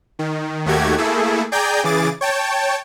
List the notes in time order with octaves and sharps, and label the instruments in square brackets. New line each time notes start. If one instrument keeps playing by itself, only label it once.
[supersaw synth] D#3
D#2 D#3 A3 F#4 G4 G#6
A3 A#3 E4 G#4 A4
G#4 D5 G5 G#5 A#5 G6
C#3 E3 G#4 D6 A6
C#5 G5 A5